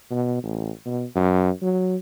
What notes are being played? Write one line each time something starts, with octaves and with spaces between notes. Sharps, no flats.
B2
A1
B2
F#2
F#3